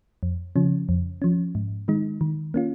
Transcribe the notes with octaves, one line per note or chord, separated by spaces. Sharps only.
F2
C#3 F3 C#4
F2
F3 C#4
G#2
D#3 G#3 D#4
D#3
A#3 C#4 F4